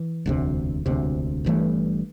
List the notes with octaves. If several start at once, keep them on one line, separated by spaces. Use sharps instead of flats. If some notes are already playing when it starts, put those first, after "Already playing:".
Already playing: E3
E1 D2 C3
E1 D2 C3
G1 G2 E3 A3